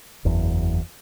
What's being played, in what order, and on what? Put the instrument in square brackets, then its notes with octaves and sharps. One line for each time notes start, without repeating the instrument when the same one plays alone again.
[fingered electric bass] F#1 E2